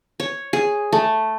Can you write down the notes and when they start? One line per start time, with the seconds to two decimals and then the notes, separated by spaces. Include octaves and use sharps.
0.20 C#5
0.53 G#4
0.93 A3